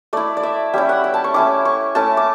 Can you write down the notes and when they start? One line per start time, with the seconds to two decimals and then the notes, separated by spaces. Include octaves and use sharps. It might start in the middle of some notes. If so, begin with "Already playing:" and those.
0.13 A3 E4 D5
0.37 D5
0.43 E5
0.74 G3 C#4 E4 E5
0.89 F#5
1.04 G5
1.14 A5
1.24 C#6
1.34 A3 C#4 E4 D6
1.65 C#6
1.95 A3 C#4 E4 A5
2.17 D6